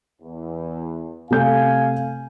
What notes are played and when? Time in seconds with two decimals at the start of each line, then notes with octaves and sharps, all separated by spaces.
0.22 E2
1.31 C3 A3 F5 G#5 G6